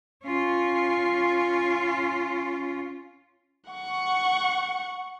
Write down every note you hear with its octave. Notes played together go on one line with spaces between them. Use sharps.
C#4 F4
F#5 C#6